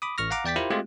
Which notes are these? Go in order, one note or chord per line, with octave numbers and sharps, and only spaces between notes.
B5 D6 D#6
A1 C#6 F6 A#6
F5 F#5 A#5 D6
E2 D5 G5 A6 B6
E4 F4 G4 A#4 C5
G#3 A3 C4 F4 G4